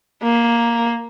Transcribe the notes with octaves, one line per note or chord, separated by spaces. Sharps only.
A#3